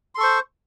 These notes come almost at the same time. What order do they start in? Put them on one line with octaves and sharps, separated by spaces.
C6 A4 C#6 C5